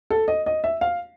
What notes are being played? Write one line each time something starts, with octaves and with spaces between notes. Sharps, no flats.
A4
D#5
D#5
E5
F5